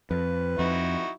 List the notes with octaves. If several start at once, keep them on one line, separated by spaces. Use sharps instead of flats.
F2 B4
F2 D#4 E4 F#4